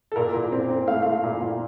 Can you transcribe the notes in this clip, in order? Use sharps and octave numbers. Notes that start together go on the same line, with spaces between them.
A4
A#2 A#4
A#2
C4
C4
A3 F5
A3 F5
A#2
A#2